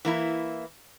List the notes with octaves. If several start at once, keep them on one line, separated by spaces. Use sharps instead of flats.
E3 A#3 E4